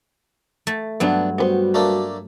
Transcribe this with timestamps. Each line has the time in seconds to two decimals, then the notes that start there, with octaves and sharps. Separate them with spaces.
0.67 A3
1.00 G2 F#3 B3 D4
1.38 G3 B3 F#4 B4 C5
1.74 A3 A#3 D4